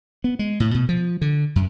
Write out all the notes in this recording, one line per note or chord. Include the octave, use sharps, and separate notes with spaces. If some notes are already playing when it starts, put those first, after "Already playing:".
B3
G#3
A2
B2
F3
D3
F#2